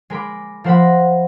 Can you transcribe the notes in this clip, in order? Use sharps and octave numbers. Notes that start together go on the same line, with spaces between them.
G#3 A#4 B5 D6
F3 A#4 C5 F#5 A#5 B5